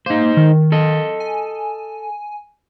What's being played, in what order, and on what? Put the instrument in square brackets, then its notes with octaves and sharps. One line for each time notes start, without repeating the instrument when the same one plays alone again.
[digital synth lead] A#3 [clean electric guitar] D#4 C5
[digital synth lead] D#3
[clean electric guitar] A4 D#5
[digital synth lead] G#5